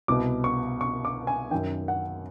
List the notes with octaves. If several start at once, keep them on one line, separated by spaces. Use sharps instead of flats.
C2 B2 D6
C#6
C#6
D6
G#5
F#2 D#3 G5
F#5